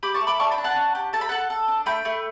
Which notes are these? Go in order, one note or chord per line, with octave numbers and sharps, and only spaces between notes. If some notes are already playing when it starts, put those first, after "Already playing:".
G4 B5 D6
A5 C#6
A3
B5 D6
D4 A5 C#6
G5 B5
D4
F#5 A5
C#4
G4
A4 A5
B5
A4 F#5 A5
A4
D4
A3 G5 B5
A3